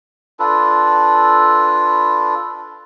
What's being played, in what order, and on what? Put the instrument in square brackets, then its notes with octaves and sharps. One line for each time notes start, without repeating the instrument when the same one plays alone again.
[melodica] D4 F4 A4 B4